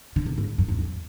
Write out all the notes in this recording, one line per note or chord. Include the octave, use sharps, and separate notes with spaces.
D3
A#2
G#2
F#2
G#2
F2